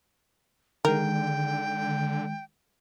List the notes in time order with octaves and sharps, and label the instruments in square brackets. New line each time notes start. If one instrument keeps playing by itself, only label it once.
[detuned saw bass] D3 [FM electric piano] D#3 G#3 [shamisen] A#4 [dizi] G5